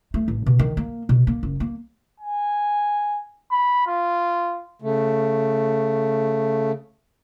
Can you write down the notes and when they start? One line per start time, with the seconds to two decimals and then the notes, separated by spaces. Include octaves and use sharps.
0.14 A3
0.28 A1
0.46 B2
0.59 D#3
0.77 A#3
1.09 B2
1.27 A#3
1.43 F#1
1.60 A#3
2.20 G#5
3.51 B5
3.87 F4
4.82 C#3 A3